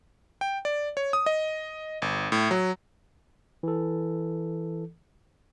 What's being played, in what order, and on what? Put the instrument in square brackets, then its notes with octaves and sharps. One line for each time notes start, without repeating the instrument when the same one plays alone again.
[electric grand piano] G5
D5
C#5
D#6
D#5
G1
A2
F#3
[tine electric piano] E3 A4